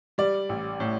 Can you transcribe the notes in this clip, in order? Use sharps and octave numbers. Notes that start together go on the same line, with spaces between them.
G3 D5
A1
A2